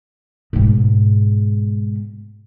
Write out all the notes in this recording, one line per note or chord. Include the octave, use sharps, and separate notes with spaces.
G#2 B2